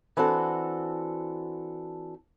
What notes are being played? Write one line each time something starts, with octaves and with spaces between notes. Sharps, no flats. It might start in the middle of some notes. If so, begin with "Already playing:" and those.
E3 C4 D4 F#4 A4